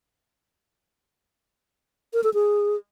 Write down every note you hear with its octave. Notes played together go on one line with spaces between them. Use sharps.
A#4
A4
G#4